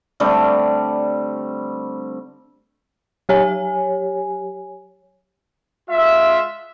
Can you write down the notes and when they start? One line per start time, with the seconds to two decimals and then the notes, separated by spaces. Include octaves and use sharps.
0.20 D3 G3 A3 C4
3.29 F#3 G4 C#5 G#5
5.90 G#3 F4 E5